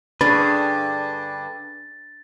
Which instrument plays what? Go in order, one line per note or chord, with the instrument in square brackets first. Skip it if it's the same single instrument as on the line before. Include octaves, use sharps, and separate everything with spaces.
[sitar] G2 D3 [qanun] C#4 D4 G#4 [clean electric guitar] B4 [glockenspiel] A6